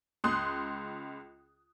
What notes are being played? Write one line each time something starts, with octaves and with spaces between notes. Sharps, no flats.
C#2 C6 D#6 F#6